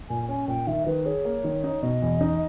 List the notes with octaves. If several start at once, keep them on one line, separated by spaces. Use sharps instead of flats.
A#2 G#5
C#4 G#5
A#2 G5
D#3 E5
D#3 B4
G#4 C#5
A#3
D#3
D#4
B2 D#5
E2
D#4